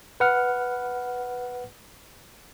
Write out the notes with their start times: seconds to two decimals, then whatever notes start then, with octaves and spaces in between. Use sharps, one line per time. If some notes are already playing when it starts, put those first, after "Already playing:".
0.20 B4 F#5 F6